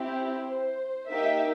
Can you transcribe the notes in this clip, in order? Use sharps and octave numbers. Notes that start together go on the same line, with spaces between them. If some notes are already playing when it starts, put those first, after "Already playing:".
Already playing: C4 E4 G4
C5
C5
A#3 D#4 G4 E5